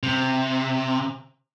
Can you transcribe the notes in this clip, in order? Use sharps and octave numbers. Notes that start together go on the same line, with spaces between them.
C3